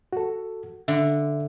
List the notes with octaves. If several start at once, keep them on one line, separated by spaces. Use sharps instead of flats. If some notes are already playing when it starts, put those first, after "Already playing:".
F#4 A4
D3 E5